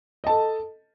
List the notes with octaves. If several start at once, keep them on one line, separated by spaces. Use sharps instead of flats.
A4 D#5 A5